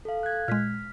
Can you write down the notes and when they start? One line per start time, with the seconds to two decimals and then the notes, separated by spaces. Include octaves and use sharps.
0.05 A4 F5
0.23 F#6 G#6
0.48 A#2 G#3 F6 B6